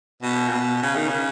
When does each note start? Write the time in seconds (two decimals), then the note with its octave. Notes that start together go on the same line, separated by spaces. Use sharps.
0.23 B2
0.49 A#2
0.53 B2
0.83 C#3
0.96 D#3
1.08 C#3